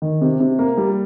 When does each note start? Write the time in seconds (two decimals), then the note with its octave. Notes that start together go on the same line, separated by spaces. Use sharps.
0.02 D#3
0.21 C3
0.40 C3
0.59 A#3
0.77 G3